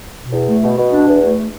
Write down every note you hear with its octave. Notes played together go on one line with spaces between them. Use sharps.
B2
E2
A3
B2
B2
D4
E2
A3